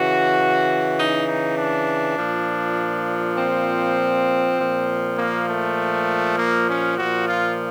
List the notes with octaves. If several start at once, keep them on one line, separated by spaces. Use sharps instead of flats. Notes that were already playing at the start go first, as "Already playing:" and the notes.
Already playing: C#3 E3 F#4
D#4
D#4
D4
A#2 F3
C4
A#2 F3
A#3
A3
A#3
C#4
A#2 F3 F#4
F4